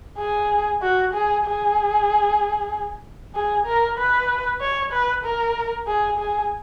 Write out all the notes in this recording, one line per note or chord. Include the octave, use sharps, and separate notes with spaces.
G#4
F#4
G#4
G#4
G#4
A#4
B4
C#5
B4
A#4
G#4
G#4